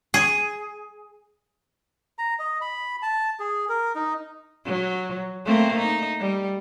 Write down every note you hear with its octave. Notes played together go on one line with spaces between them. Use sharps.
G#4
A#5
D#5
B5
A5
G#4
A#4
D#4
F#3
A3 A#3 C4
D#4
G3